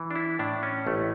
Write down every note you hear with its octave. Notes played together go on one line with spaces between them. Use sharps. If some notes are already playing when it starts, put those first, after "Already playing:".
Already playing: E3
D4
E4
A2 D4
C#4
A1 A3